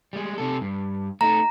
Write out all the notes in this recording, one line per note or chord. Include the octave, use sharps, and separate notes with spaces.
G3 G#3
C3 A4
G2
A3 D#4 A#5